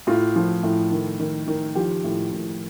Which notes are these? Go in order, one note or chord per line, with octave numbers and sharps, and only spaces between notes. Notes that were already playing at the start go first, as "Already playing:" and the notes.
A2 F4
F3
A2
D#3
D#3
D#3
F3 G4
A2
A2